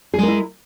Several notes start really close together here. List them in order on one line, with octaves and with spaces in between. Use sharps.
G#4 G#3 A#4 E4